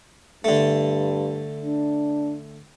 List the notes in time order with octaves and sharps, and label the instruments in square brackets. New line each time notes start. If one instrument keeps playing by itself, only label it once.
[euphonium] G2 [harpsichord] D3 A3
[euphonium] D4